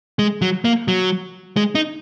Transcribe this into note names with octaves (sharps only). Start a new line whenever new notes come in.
G#3
F#3
A#3
F#3
G#3
D#4